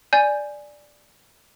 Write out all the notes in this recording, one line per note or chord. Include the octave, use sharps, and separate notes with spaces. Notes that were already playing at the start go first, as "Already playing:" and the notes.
D5 G#5 G6